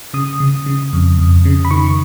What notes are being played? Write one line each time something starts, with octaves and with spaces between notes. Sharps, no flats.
C#3 D#6
C#3
C#3
F2
F2
C#3
B5
D#3 C#6